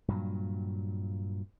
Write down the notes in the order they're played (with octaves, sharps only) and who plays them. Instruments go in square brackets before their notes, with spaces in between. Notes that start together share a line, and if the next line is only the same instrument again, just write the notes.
[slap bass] G2 A#2 F#3